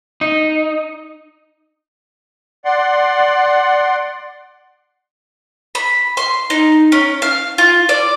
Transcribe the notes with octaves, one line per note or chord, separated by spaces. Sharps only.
D#4
D5 F#5 C6
B5
C6
D#4
C#4
F5
F4
D5